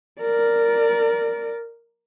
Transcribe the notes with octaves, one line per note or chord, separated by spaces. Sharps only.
A#4 D5